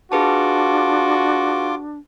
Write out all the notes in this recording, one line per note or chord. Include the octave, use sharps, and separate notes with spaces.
D4 F4 F#4 G#4 B4 A5 D6